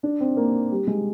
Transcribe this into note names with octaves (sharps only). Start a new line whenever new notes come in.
D4
C4
A#3
G3
G#3